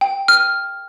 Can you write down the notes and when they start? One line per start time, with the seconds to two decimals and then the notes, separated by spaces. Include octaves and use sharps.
0.01 G5
0.28 F6